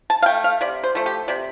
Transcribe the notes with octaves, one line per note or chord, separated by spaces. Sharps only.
A5
F5
A3 G5
F5
C3 D5
C5
F3 A3
G4
C3 D5